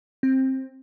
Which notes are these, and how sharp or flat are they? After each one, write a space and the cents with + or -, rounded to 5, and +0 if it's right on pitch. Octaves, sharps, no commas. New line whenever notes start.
C4 +15